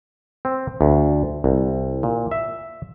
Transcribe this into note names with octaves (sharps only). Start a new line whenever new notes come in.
C4
D2
C2
A#2
E5